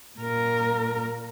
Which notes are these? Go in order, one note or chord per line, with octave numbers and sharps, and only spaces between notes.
A#2 A#4